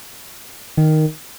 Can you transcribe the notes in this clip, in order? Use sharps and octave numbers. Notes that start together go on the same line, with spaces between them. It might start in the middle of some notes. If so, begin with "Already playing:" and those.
D#3